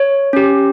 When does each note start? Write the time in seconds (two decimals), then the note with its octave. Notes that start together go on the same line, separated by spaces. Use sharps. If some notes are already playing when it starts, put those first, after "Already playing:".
Already playing: C#5
0.33 C#4 G4